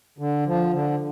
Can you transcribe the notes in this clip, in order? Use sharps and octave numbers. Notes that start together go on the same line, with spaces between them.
D3
F3
D3